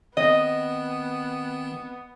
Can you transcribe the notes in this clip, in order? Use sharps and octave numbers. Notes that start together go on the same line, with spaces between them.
D#3 B3 C4 D#5